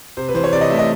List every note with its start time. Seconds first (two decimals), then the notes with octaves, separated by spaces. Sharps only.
0.17 C3 C5
0.29 B4
0.35 E3 C5
0.44 C#5
0.53 C3 D5
0.61 D#5
0.70 A3 E5
0.79 D#5